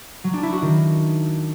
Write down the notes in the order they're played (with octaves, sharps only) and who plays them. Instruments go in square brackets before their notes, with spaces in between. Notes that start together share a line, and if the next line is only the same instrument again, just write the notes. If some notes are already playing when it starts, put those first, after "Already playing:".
[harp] F#3
D4
E4
F#4
D#3